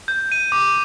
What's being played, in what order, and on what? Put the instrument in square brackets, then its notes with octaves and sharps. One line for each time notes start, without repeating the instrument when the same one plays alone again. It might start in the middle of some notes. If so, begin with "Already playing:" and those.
[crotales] G6
D#7
D6